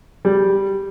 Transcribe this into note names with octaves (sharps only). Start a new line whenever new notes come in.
G3